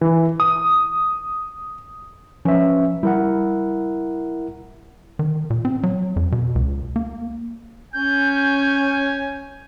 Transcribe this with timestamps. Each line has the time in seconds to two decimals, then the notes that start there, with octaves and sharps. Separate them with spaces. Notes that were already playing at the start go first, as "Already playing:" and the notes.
0.01 E3
0.40 D#6
2.45 F3 C#4 B4 E5
3.03 G3 E4 A#4 F#5
5.19 D#3
5.50 A#2
5.65 C4
5.83 F#3
6.16 F2
6.32 B2
6.55 C#2
6.96 A#3
7.93 C#4 G#5 G6